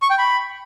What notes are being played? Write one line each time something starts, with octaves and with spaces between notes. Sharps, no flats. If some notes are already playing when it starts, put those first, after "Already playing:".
C#6
G5
B5